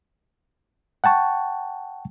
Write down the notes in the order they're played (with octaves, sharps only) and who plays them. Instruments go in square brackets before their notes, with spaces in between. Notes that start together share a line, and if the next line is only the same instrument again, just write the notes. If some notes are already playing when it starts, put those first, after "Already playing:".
[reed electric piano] F#5 G5 A5 C#6